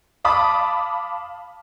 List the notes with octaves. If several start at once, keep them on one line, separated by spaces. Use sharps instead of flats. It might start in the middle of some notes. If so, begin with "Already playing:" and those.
F5 A5 B5 D6 D#6